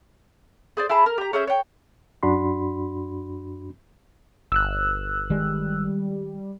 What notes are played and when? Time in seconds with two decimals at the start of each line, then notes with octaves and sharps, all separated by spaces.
0.77 G#4 C5 D5
0.89 E4 G#4 A5 B5
1.06 A#4
1.18 G4 A#5
1.33 C#4 G#4 E5 G6
1.47 C#5 G5
2.23 F#2 D4 F#4 B5 C6
4.52 G1 E6 F#6
5.30 D#3 G3 G#3